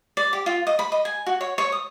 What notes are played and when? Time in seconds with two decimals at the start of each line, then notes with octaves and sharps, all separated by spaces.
0.17 D5
0.33 G4
0.46 F4
0.67 D#5
0.79 B5
0.92 D#5
1.05 G#5
1.27 F#4
1.41 C#5
1.58 C#5
1.72 D#6